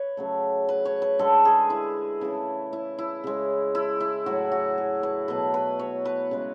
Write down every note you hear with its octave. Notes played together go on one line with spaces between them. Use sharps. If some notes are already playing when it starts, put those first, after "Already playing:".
Already playing: B4 C#5
C#3 F#3 A3
B4
C#5
B4
D3 G#3 A4
G#4
E4
C#3 E3 A3 E4
E4
E4
C#3 G#3
E4
E4
A2 F#3 A3 F#4
F#4
G#4
B4
B2 F#3 A3 B4
B4
C#5
B4
C#3 G#3